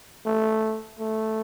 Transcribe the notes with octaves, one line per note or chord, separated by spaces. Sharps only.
A3
A3